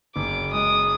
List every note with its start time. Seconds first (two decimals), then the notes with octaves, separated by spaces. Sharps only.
0.15 F#1 D6
0.52 G#3 D#6